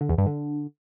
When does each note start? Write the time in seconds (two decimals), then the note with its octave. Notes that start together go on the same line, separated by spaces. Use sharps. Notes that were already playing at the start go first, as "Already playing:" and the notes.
0.01 D3
0.09 E2
0.18 G2
0.26 D3